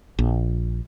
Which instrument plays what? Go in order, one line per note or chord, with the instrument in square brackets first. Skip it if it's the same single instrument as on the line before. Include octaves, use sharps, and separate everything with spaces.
[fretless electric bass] A#1